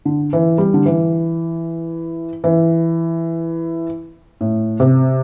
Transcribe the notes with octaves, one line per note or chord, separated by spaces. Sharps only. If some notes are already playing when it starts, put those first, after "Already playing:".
D3
E3
G3
D3
E3
E3
A2
C3